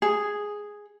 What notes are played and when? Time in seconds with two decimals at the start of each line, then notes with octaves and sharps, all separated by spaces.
0.02 G#4